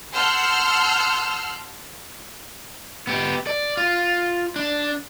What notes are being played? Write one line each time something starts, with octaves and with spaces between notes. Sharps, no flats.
F#5 A5 C6 E6 F6 G6
B3 G4
D5
F4
D4